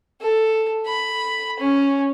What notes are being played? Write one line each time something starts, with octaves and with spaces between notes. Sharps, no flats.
A4
B5
C#4